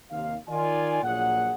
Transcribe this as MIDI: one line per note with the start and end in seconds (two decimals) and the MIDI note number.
0.11 0.37 39
0.11 0.37 48
0.11 0.37 77
0.48 1.03 51
0.48 1.03 65
0.48 1.03 74
0.48 1.03 80
1.03 1.55 34
1.03 1.55 46
1.03 1.55 54
1.03 1.55 68
1.03 1.55 78